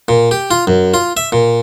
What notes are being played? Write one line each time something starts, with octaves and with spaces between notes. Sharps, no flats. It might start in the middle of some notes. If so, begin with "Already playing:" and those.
A#2
G4
F4
F#2
F4
E5
A#2